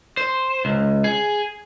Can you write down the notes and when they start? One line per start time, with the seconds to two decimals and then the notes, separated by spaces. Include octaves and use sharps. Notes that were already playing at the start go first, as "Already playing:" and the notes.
0.17 C5
0.65 C#2
1.04 G#4